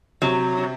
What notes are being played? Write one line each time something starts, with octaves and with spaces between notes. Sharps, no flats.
C3 F#3